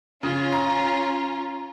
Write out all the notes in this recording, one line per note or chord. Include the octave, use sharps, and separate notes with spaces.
C#3 C#4 F4
A#5